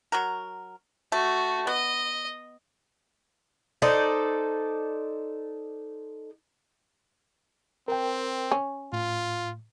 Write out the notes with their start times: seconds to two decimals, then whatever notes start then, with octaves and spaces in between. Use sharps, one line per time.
0.12 F#3 F#4 A#4
1.12 A3 F#4
1.67 B3 D#5
3.82 D#4 A4 C5 D5
7.88 C4 A#4 G5
8.51 C#4
8.93 A2 F4